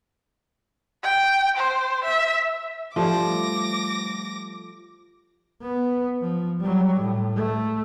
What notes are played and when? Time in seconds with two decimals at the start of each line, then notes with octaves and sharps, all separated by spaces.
1.03 G5
1.56 C5
2.04 E5
2.96 F3 G3 A3 D6 A#6
5.62 B3
6.22 F3
6.60 F#3 G3
7.01 A2
7.36 A3